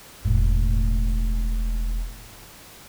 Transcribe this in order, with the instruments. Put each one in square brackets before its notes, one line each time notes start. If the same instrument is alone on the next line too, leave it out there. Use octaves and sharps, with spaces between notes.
[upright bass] E1 A2